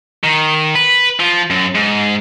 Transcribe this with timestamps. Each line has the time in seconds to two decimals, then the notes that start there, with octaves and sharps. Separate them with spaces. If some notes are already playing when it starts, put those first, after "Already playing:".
0.24 D#3
0.75 B4
1.20 F3
1.51 F#2
1.75 G#2